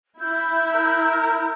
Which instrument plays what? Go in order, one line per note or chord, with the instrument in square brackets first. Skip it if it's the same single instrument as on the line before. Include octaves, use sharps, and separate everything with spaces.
[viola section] E4 [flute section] E6 G6
[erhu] A#4